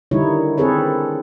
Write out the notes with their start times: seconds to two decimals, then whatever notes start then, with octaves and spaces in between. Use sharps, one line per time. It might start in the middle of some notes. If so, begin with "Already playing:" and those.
0.11 D3 D#3 G3 D#4 E4 C#5
0.58 D#3 C4 G#4 A4 B4 C#5